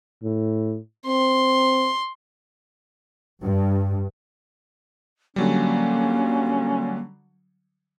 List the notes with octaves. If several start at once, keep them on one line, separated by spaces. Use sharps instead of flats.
A2
C4 C6
G2
D3 F#3 G3 A#3 C#4